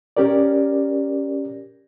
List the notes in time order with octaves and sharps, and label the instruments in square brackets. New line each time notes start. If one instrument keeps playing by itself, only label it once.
[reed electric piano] C#4 G4 A#4 D5